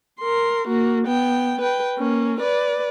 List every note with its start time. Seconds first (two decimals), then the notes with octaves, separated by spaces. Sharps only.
0.21 A#4 C6
0.68 A#3 F#4
1.07 B3 G5
1.61 B4 G5
1.98 A#3 C#4
2.41 B4 D5